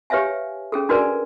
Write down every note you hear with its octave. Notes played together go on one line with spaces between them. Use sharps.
G4 B4 C#5 E5 F5 G#5
C#4 G#4 A4
D4 F#4 A#4 B4 D5 G#5